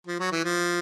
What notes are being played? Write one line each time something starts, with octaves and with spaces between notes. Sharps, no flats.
F3
F#3
E3
F3